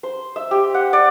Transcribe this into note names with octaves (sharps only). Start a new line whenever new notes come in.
C5
E5
G4
F#5
D5